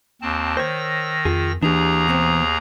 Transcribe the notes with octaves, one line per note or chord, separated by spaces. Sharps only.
D#2 C4 A5
D#3 C5 C#5 E6 A#6
F2 F4 G#4
D#2 E3 D4 G4 G#4 A#5
B2 B3 C4